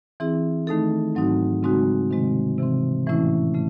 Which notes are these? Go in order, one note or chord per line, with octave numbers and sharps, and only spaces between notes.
E3 C4 E4 G#4
D#3 A3 D#4 A4
G#2 F#3 C4 D#4 F#4
C#3 G#3 C4 D#4 F#4
C3 D#3 G#3 C4
C3 E3 C4
A2 E3 A3 C#4 E4
C#3 A3